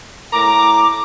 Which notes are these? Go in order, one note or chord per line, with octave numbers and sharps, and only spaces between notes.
A2 A#5 D6